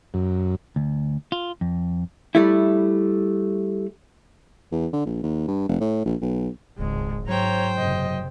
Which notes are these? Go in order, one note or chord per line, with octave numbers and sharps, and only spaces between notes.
F#2
D2
F4
F2
G3 A3 E4
E2
D3
A#1
D#2
G2
F1
A2
A#1
B1
D1 G#1 C#2 G#3
G#2 F#3 C5 C#5 G5 A#5
F#1 C3 D#5